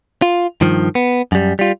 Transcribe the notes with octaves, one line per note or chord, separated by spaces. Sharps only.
F4
G2 D#3 F3
B3
F#2 G3
G3 F4